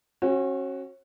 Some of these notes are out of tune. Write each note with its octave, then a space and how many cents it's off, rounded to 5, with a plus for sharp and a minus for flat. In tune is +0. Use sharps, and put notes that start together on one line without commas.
C#4 -35 F#4 +5